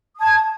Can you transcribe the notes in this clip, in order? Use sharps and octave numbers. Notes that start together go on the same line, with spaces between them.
A5 D#6 G#6